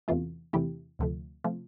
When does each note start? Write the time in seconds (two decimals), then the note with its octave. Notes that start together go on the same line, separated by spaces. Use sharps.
0.08 E2 C3 E3 A3 F4
0.53 E2 C3 E3 A3 E4 G4
0.99 D2 C3 F3 A3
1.44 C3 F3 A3